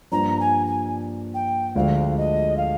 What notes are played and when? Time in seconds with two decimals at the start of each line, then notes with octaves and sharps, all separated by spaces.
0.12 G2 F3 A#3 D4 A#5
0.39 G#5
0.66 G#5
1.34 G5
1.76 D2 D3 F3 G#3 D4 F5
2.17 D#5
2.57 F5